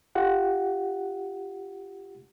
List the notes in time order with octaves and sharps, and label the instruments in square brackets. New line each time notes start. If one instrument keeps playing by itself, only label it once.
[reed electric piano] F4 G4 F#5